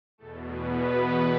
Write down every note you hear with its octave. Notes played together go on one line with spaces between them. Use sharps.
E2 B2 A3 A4
B3 B4